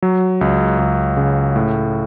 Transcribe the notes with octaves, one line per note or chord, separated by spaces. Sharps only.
F#3
C#2
C#2
C#3
A2